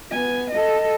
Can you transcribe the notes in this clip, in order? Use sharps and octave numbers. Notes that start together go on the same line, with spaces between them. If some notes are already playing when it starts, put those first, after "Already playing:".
B3 G#5
A4 D#5